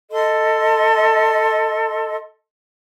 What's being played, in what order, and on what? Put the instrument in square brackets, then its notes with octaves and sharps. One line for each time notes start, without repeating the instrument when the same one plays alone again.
[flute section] A4 D#5 C6